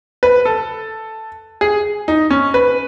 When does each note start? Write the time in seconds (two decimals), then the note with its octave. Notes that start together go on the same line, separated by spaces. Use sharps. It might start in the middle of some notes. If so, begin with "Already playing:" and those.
0.23 B4
0.45 A4
1.61 G#4
2.08 D#4
2.31 C#4
2.54 B4